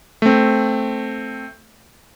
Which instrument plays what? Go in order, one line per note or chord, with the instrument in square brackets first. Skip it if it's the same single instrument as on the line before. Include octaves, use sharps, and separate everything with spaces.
[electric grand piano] A3 C4